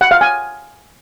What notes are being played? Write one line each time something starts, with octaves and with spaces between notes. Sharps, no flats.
F#5
F5
G#5